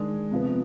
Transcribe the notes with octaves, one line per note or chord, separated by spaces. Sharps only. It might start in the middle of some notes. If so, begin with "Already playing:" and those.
Already playing: D#3 G#3 D4 G#4
C3 F3 B3